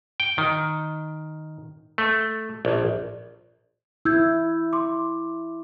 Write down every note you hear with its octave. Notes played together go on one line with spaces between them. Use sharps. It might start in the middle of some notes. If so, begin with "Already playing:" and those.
G5
D#3
A3
A#1
E4 E6 G6 G#6
C6 D6